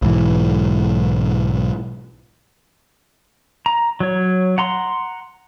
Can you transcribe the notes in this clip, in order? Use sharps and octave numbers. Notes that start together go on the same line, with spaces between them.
B1 G#2 E3
A#5
F#3 C#5
F#5 A#5 C6